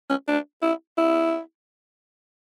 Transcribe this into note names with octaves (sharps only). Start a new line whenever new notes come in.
C#4
D4
E4
E4